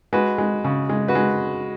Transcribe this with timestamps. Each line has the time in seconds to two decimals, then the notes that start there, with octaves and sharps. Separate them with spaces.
0.13 G#3 F#4 B4
0.38 G#3
0.64 C#3
0.89 G#3
1.08 F#4 B4
1.15 G#3